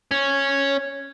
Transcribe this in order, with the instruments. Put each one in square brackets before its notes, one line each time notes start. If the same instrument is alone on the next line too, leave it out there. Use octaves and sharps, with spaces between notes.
[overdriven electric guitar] C#4